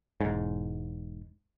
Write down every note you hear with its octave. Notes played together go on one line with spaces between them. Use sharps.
E1 G#2